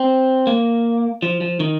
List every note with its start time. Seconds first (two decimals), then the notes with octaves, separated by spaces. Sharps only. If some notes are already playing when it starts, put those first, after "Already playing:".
Already playing: C4
0.47 A#3
1.22 F3
1.41 F3
1.60 D#3